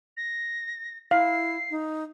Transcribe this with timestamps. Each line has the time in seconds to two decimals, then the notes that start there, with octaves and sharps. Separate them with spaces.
0.17 A#6
1.11 E4 F5 C7
1.71 D#4